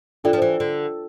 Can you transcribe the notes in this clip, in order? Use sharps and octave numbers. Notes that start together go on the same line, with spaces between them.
E3 D4 F4 A4 D5 G5
F3
E3
D3